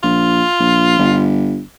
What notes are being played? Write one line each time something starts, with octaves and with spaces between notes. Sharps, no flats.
A#1 F4
A#1
G1